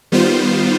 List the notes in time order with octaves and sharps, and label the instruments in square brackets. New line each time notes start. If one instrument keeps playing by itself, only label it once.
[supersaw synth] D#3 G3 B3 F4 C5